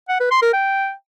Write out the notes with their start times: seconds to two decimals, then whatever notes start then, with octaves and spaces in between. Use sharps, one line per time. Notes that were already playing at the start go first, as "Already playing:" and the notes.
0.09 F#5
0.20 B4
0.31 C6
0.42 A#4
0.53 G5